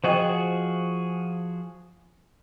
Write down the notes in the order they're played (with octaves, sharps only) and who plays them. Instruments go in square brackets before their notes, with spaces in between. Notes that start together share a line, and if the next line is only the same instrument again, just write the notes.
[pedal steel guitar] F3 F#4 G#4 [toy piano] C5 D#5 G5